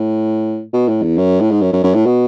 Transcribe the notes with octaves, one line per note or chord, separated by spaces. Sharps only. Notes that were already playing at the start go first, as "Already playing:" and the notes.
Already playing: A2
B2
A2
E2
F#2
A2
G#2
F#2
F#2
F#2
A2
B2